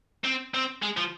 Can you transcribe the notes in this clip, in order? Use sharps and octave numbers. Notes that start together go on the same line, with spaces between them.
C4
C4
G#3
F3